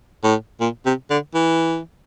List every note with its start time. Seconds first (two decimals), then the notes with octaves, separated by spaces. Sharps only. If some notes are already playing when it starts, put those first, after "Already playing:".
0.24 A2
0.61 A#2
0.86 C3
1.10 D3
1.34 E3